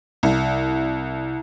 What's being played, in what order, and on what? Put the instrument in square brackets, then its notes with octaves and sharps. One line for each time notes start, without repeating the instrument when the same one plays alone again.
[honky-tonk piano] C2